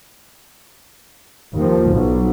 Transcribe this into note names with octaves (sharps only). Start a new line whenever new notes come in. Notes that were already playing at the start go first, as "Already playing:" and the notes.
D#2 F3
B1